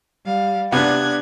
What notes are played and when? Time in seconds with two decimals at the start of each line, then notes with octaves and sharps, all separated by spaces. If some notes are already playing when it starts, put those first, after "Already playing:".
0.25 G3 F5
0.72 C3 B3 D4 F#6 G#6